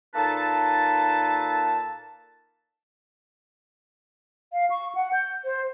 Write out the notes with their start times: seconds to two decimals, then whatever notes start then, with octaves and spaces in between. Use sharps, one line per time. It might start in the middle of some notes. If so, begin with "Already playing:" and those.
0.14 A#2 A#3 D#4 A4 B4 A5
4.53 F5
4.70 C#6
4.95 F#5
5.13 G6
5.45 C5